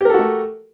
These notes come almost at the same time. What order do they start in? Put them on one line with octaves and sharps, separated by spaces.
G4 A#4 A4 F#4 A3